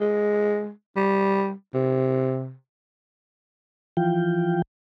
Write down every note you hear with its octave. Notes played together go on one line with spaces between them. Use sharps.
G#3
G3
C3
E3 F3 F4 G5